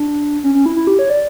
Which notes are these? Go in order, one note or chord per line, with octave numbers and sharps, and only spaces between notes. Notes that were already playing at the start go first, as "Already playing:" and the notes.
Already playing: D4
C#4
C#4
E4
E4
G4
C#5
D5